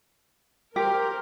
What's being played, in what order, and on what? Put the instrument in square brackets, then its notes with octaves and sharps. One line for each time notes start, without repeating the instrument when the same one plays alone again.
[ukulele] G4 [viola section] A#4 C5